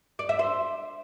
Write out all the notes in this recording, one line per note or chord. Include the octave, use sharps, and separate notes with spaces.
D5
E5
C5